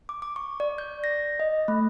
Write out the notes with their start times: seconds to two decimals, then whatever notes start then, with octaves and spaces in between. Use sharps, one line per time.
0.09 D6
0.22 D6
0.36 C#6
0.60 D5
0.78 G6
1.04 A#6
1.40 D#5
1.68 A3